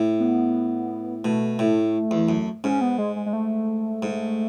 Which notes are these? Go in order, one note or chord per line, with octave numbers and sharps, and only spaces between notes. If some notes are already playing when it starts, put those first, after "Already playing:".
Already playing: A2
B3
B2 A3
A2
E2
F#2
G#2 C#4
B3
G#3
G#3
G#3
A3
G#2